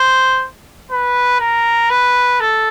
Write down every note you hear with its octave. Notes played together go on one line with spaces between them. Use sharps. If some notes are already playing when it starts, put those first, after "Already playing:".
Already playing: C5
B4
A#4
B4
A4